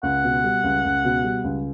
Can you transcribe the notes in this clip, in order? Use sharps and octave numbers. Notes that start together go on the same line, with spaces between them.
C#2 F#5
B2
G3
C#2
C#2
B2
G3
C#2